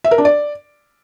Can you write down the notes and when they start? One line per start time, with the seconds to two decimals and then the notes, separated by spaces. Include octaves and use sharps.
0.04 E5
0.11 A#4
0.18 D4
0.25 D5